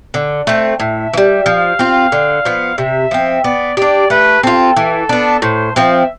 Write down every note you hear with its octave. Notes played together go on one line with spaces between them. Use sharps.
D3
A3 C4
A2 E5
E3
G3
F3 F5
C4 F4
D3
F3 B3
C3 E5
F3 C4
B3 D5
D4 G4 D5
A3 B4
C4 F4 A4
E3 A4
B3 D4
A2 C5
F3 C4 E5